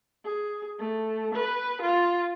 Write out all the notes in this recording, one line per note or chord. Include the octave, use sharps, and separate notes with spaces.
G#4
A3
B4
F4